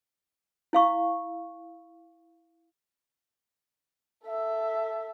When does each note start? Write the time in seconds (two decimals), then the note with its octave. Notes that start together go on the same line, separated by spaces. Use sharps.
0.73 E4 F5 C#6
4.25 A4 E5